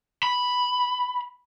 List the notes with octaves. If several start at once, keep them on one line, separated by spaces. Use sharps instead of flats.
B5